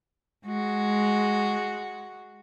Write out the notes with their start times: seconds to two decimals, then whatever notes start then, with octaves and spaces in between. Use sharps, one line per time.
0.46 G#3 F#4